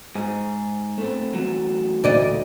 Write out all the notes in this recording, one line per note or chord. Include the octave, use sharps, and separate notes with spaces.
G#2 G#4
A3 C4
E3 F#3 A3
D2 D5 D#5